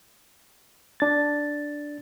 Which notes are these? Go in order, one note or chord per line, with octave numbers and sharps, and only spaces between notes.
D4 A6